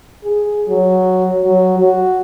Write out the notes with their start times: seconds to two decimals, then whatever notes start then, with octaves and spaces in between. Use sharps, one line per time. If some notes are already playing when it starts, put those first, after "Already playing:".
0.25 G#4
0.68 F#3
1.44 F#3
1.78 F#4